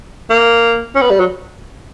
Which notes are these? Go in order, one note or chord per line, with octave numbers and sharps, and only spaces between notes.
A#3
C#4
B3
G3
F#3